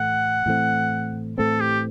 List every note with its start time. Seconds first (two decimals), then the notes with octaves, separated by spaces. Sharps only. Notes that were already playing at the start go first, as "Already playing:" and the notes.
Already playing: A2 E3 A3 F#5
0.46 A2 E3 A3 C4
1.38 A2 E3 A3 C4 A4
1.61 G4